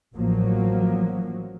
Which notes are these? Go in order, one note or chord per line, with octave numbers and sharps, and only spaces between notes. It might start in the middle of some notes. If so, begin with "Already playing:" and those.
A1 F3 F#3 A#3